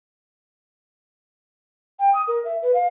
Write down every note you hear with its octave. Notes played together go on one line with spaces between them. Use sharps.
G5
D#6
A#4
E5
B4
F5